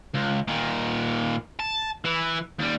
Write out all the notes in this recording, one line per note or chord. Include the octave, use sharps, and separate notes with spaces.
C#2
A#2 D#3
A5
E3 E4
D#2 G3